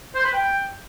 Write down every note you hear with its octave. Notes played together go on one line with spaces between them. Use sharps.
C5
B4
G5